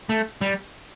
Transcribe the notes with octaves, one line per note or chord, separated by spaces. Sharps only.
A3
G3